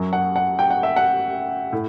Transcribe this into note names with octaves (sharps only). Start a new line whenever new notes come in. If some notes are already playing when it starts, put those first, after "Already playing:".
Already playing: F#2 F#3
F#5
F#5
G5
F#5
E5
F#5
A2